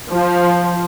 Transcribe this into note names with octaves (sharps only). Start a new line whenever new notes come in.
F3